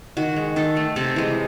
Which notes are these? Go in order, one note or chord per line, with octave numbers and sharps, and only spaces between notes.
D#3 F#4
G#3
D#3 A4
A3
C3 A4
E3 G#3